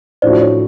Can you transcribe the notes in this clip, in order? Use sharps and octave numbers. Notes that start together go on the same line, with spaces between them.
A2 F3 A3 D4 F#4 C5 D5
C#5